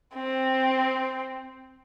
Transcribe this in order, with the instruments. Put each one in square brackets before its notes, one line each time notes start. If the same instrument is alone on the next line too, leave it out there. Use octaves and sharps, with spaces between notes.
[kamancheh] C4